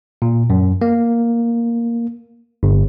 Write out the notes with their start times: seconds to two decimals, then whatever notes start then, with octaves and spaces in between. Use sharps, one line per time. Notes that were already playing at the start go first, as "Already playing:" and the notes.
0.22 A#2
0.50 F#2
0.82 A#3
2.63 G1